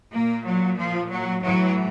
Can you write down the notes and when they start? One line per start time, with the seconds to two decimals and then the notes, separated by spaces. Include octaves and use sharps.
0.12 A#2 A#3
0.44 F#3
0.76 F3
1.09 F#3
1.41 A2 E3 F#3